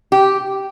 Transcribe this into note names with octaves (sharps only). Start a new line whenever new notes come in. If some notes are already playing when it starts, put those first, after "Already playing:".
G4